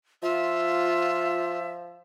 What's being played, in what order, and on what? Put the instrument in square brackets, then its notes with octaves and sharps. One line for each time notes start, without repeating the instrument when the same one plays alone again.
[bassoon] F3 [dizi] F4 [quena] E5